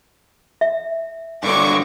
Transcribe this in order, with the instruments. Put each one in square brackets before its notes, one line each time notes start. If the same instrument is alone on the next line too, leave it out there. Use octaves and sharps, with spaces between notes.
[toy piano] E5
[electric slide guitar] G2 D3 F#3 [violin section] C#6 D6